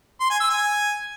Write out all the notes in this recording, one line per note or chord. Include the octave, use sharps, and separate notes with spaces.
C6
G#5
E6
G#5